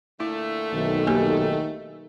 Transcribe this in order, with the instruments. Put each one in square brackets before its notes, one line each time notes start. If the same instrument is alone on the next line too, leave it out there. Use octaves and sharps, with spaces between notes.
[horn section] A#2 D3 A3 [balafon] E4
[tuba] B1 [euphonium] D#3
[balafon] A#3 G4 A4